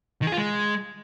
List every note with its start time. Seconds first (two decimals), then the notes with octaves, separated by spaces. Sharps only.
0.22 D#3
0.27 G#4
0.32 F4
0.37 G#3